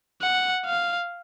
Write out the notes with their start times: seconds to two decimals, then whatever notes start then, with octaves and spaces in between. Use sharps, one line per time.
0.22 F#5
0.65 F5